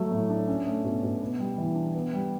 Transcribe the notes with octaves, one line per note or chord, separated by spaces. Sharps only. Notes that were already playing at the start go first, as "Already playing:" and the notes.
Already playing: F#3 A3
A2
D4
C#4
A3
B2
B2
B3
G3
E3
D4
B3
G3